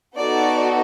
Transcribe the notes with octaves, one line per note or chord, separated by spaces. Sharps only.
B3 D#4 F#4 A4 D5